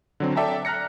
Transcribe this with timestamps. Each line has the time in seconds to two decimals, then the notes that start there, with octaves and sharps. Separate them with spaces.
0.20 D3 F#3 C4
0.36 A4 D5 E5 G5 A5 A#5
0.65 A#5 F6 F#6 A#6 C#7